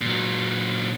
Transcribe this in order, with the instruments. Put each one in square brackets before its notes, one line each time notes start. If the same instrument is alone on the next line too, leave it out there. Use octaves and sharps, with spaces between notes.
[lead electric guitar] A#2 F#3